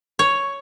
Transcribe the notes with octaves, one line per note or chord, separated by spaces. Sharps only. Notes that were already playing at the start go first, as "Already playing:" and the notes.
C#5